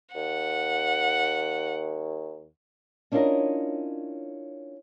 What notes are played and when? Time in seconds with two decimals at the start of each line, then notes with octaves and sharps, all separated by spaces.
0.15 D#2 F#5
3.12 C#4 D4 E4 F4 A#4 D#5